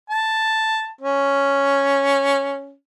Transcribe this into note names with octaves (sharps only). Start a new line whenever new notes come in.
A5
C#4